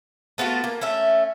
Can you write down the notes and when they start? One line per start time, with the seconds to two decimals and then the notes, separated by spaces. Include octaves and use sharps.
0.38 A3 B3 F4 F#4
0.64 A#3
0.81 A3 C#4 E5